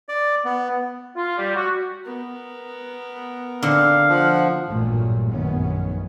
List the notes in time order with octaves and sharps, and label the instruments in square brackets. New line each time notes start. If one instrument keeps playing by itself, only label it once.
[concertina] D5
B3
[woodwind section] F4
G3
F#4
[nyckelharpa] B3 A#4
[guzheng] D3 C4 [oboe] F5
[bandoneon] F3 [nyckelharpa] F#5
[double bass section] A1 G2 A#2 F#3 A3
F1 A#1 F#2 D#3 B3 C#4